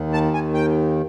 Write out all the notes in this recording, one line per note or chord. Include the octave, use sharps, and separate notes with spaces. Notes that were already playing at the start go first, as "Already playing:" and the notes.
Already playing: D#2 D#3
A5
G#5
G5